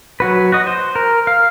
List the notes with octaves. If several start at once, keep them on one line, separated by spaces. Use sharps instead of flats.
F#3 F#4 B4
F#4 D#5
C5
A#4
F5